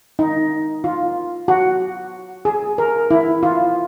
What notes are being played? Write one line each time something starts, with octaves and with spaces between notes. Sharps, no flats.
D#4
F4
F#4
G#4
A#4
E4
F4